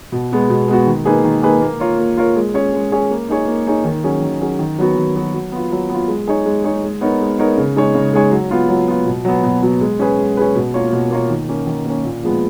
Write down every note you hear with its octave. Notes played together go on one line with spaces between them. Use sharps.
B2
G#3 B3 F#4
B2
G#3 B3 F#4
D#3
A#3 D#4 G#4 B4
D#3
A#3 D#4 G#4 B4
A#3
F4 A#4 C#5
A#3
F4 A#4 C#5
G#3
C#4 G#4 C#5
G#3
C#4 G#4 C#5
A#3
D#4 G#4 C#5
A#3
D#4 G#4 C#5
D#3
F#3 C#4 G#4
D#3
F#3 C#4 G#4
D#3
F#3 B3 F#4
D#3
F#3 B3 F#4
F#3
B3 F4
F#3
B3 F4
G#3
D#4 G#4 C#5
G#3
D#4 G#4 C#5
G#3
B3 D#4 A#4 C#5
G#3
B3 D#4 A#4 C#5
C#3
G#3 D#4 G#4 C#5
C#3
G#3 D#4 G#4 C#5
F#3
B3 F4
F#3
B3 F4
B2
F#3 B3
B2
F#3 B3
G#3
C#4 G#4 B4
G#3
C#4 G#4 B4
B2
A#3 F4 A#4 C#5
B2
A#3 F4 A#4 C#5
D#3
A#3 C#4
D#3
A#3 C#4
A#2
F3 G#3 B3